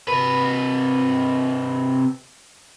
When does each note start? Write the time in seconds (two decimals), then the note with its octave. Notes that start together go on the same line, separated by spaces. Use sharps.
0.08 C3 B4